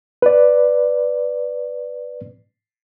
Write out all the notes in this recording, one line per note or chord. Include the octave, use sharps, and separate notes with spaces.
B4 D5